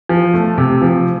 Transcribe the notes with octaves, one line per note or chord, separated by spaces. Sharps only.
F3
A3
C3
F3